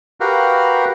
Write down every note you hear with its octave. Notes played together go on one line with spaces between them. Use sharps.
F#4 G4 A#4 B4 F5